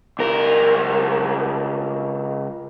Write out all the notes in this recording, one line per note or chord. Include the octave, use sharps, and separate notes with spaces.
C#2 A#4